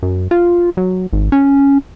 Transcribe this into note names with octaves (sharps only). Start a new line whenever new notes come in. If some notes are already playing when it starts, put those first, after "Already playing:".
F#2
F4
F#3
G#1
C#4